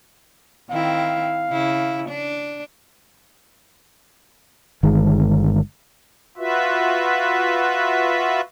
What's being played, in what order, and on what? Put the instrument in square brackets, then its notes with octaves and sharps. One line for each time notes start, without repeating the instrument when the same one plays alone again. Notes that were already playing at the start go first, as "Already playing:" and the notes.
[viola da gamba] D#3 C4 E4 [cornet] F5
[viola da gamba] C#3 E4
D4
[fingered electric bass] G1 D#3 G#3
[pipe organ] F4 F#4 B4 E5